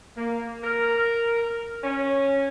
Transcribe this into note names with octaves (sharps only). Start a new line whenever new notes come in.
A#3
A#4
C#4